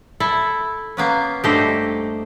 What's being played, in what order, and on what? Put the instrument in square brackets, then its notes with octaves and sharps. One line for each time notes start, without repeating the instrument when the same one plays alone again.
[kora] E4 [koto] A4
[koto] A#3 B3 C#4
[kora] G2 A3 D#5 [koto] G4 C5